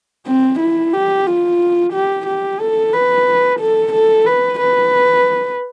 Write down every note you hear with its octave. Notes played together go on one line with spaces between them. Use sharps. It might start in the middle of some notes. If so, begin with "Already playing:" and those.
C4
E4
G4
F4
G4
G4
A4
B4
A4
A4
B4
B4